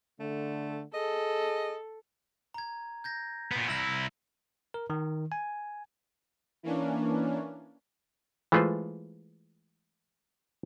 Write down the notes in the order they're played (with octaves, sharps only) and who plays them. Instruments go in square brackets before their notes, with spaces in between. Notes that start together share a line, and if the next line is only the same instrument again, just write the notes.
[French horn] D3 [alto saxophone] A3
[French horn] G#4 [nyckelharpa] A4 [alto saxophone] D#5
[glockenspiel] A#5 G#6
G6 G#6 A#6
[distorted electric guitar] A#2 B3
[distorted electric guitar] C2 E4 [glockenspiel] E6 A#6 F#7
[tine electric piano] A#4
D#3
G#5
[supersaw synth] E3 A#3 C#4 D4
[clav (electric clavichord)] E3 G#3 A3 F4 B4 C5